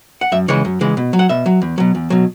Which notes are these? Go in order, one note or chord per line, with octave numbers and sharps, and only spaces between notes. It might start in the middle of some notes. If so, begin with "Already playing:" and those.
F#5
F#2 E5
C#3 E3 G#3 C#5
F#2
C#3 E3 G#3
B2
F#3
F#5
B2 E5
F#3
E2
B2 F#3
E2
B2 F#3